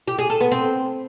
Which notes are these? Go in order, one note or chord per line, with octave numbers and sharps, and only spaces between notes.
G4
G#4
A4
B3
C4